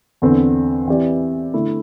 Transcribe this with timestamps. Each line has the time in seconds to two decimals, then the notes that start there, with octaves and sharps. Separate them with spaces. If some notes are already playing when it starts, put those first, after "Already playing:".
0.22 E2 D3 C4
0.88 E3 C4 G4 D5
1.54 D3 A3 E4